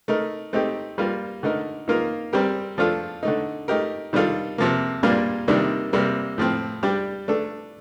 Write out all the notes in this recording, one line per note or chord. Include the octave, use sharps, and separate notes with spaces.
A3 D#4 A#4
A3 C4 D#4 G4
G3 A#3 F4
D3 A3 D#4 A#4
D#3 A#3 F4 A#4
G3 C4 G4 A#4
F3 A3 D4 F4 A4
D3 A3 D#4
A3 D#4 G4 A#4
D#3 G3 D4 F4 A4
C3 F3 A#3
A#2 G3 A#3 D4 F4
C3 D#3 G3 A#3 D4
C3 G3 A#3
A2 F3 C4
G3 D4 G4
A3 D4 A4